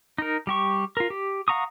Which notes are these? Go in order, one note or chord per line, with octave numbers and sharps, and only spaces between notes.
D#4 A#4
G3 G4 C#6
F4 A#4
G4
F5 F#5 A#5 C#6 D#6